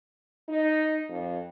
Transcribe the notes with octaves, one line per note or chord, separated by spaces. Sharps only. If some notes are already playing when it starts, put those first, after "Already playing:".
D#4
F2